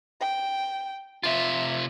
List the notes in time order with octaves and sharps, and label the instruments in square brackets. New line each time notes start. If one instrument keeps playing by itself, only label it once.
[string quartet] G5
[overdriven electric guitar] C3 F4 [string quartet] E5